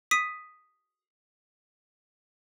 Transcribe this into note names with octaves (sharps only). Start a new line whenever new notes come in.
D#6 B6 D#7